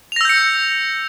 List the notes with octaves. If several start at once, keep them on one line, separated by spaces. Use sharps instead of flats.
E6 G6 A#6 C#7 F7